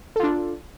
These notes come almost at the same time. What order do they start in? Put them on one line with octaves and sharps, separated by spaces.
A4 F4 D4